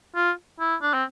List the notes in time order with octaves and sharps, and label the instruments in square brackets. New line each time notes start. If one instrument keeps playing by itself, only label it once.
[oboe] F4
E4
D4
C4